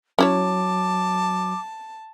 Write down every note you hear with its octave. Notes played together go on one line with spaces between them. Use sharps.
F#3 C#4 E4 C#5 A5 D6